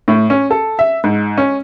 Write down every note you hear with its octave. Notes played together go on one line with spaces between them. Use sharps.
A2
C#4
A4
E5
G#2
C#4